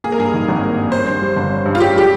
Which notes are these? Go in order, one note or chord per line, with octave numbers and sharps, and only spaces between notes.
A#3 G#4
A#4
G2 G#4
D#3
G#1
A#3
G2
C#4 C5
G2
G3
G1
C#4
G2
F4
C#4 G4
G3 G4